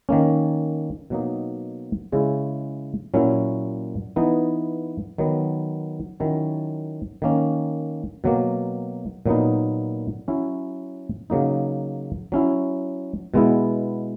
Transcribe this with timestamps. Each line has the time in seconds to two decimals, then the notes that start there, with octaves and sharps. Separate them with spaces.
0.09 D#3 A#3 C#4
1.10 B2 F#3 A#3 D#4
2.12 C#3 G#3 C#4 E4
3.14 A#2 F#3 C#4 E4
4.16 E3 B3 D#4
5.18 D#3 F#3 B3
6.20 D#3 F#3 C#4 E4
7.22 D#3 A#3 C#4
8.24 B2 F#3 A#3
9.26 A#2 F#3 B3 D#4
10.28 F#3 C#4 E4
11.30 C#3 F#3 A#3 D#4
12.32 F#3 C#4 E4
13.34 B2 G#3 B3 E4